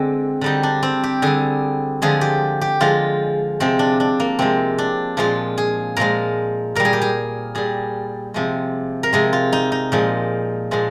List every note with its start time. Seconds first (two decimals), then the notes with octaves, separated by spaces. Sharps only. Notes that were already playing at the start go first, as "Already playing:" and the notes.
Already playing: D3 G#3 C4
0.41 D3 G3 D#4
0.63 D4
0.83 C4
1.03 G4
1.22 D3 G3 G#4
2.02 D3 F3 G#3 G#4
2.21 G4
2.61 G4
2.80 D3 F3 G#3 F4
3.60 C3 F3 G#3 C4
3.79 D4
4.00 D4
4.20 A#3
4.39 C3 F3 G#3 C4
4.78 D4
5.17 A#2 F3 G#3 F4
5.58 G#4
5.97 A#2 F3 G#3 A#4
6.75 A#2 G3 A#4
6.85 G#4
6.93 G4
7.02 G#4
7.55 A#2 G3 G#4
8.34 C3 F3 G#3
9.03 A#4
9.13 C3 F3 G#3 G#4
9.33 F4
9.53 D#4
9.72 D#4
9.92 A#2 F3 G#3
10.71 A#2 F3 G#3